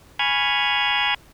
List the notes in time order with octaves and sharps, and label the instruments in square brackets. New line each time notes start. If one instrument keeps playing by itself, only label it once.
[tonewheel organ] G#5 B5 C#6 F6 G#6